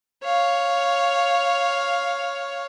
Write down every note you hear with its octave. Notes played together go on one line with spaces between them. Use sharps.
C#5 F5